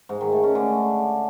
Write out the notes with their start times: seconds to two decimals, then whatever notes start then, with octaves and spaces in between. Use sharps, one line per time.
0.09 G#2
0.21 D#3
0.32 A3
0.44 C#4
0.55 D3